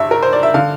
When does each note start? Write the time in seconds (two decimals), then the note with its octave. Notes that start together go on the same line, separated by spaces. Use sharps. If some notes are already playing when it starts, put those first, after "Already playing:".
Already playing: G1 G2 E5
0.11 A#4
0.23 C5
0.33 D5
0.43 E5
0.54 D3 F5